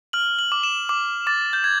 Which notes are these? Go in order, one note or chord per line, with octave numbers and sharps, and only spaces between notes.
F6 F#7
F#7
D6
E7
D6
D6 A6
G6
G#6